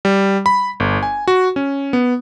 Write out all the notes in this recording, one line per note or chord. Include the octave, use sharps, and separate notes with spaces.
G3
B5
G1
G#5
F#4
C#4
B3